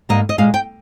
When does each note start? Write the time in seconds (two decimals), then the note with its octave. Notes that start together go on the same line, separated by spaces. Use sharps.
0.09 G#2 G3 A#3 D#5
0.29 D#5
0.38 A#2 G#3 F5
0.54 G5